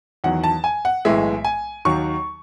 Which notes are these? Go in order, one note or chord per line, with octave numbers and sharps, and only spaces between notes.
E2 D#3 F#3 F#5
A5
G#5
F#5
B1 A2 E3 G#3 E5
G#5
D#2 D#3 F#3 C#6